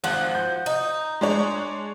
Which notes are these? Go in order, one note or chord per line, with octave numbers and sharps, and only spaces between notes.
G#1 F3 F#4 F#5 F#7
G6
D#4
G#3 D4 C#5